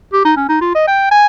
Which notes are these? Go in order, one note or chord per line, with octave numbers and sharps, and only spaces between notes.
G4
D#4
C#4
D#4
F4
D#5
G5
G#5